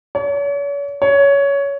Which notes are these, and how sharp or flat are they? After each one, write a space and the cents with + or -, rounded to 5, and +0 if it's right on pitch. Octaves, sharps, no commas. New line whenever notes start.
C#5 +40
C#5 +15